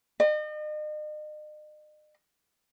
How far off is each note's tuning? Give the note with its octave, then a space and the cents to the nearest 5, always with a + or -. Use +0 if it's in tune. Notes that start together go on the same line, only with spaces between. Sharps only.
D#5 -40